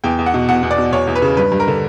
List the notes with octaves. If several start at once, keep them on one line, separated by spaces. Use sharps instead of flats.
E2 G5
E2
F#5
B2
E2 F#5
E2
D5
B2
E2 C#5
E2
B4
C#3
G2 B4
G2
A#4
D3